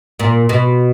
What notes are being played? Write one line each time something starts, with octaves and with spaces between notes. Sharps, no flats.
A#2
B2